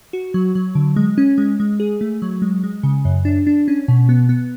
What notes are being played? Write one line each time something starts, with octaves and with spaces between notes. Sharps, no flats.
F#4
F#3
F#3
D3
G#3
C#4
G#3
G#3
G#4
A3
F#3
G#3
G#3
C#3
F#2
D4
D4
C#4
B2
B3
B3